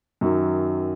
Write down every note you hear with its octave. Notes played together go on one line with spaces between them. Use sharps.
F#2 D#3 F#3